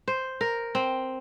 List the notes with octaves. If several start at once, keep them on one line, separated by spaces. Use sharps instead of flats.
C5
A#4
C4